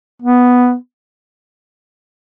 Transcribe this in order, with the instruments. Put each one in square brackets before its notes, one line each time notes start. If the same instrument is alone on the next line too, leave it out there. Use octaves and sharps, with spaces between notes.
[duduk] B3